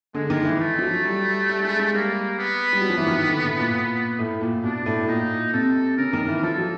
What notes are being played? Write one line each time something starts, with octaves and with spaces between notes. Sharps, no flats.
D3 G#3
D#3
E3
A3
F3
F#3
G3
G3
G#3
G#3
G3 A#3
B3
G3
F#3
F3
E3
D#3
D3
A2
A#2
A2
A#2
B2 D4
A2
A#2 D#4
C3 A4
C#3 A#4
D#3
E3
F3 A4
F#3